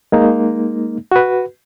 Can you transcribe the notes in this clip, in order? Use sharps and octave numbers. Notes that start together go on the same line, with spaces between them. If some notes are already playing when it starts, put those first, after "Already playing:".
G#3 A#3 D#4
F#4 B4